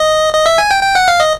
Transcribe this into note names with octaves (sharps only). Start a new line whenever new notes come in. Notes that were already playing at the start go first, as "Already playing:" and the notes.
Already playing: D#5
D#5
E5
G#5
G5
G5
F#5
F5
D#5